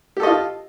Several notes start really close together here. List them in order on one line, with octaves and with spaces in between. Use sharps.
G4 A4 D#5 F4